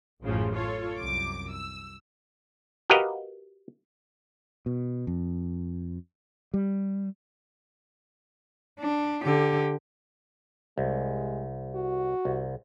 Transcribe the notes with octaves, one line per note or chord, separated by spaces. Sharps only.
A1 F#2 A2 C#3 F3
F4 A4 C#5
C2 F#2 D6
E6
F#4 G4 A#4 B4 D#5 F5
B2
F2
G3
D4
D3 G4
C2 G#3
F#4
C2